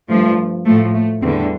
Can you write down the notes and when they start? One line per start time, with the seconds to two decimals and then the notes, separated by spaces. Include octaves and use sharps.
0.08 G2 F3 A3
0.65 A2 F3 A3
0.94 A3
1.22 E2 D3 G3 C4